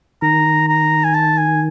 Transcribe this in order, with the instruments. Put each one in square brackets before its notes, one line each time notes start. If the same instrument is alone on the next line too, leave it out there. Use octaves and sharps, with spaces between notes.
[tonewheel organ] D#3 [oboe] A#5
[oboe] A#5
G#5
A5
G#5